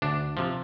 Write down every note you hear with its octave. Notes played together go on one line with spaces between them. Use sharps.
D2 D4
C3 F3